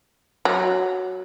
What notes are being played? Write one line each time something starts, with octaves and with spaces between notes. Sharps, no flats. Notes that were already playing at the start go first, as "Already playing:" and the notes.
F#3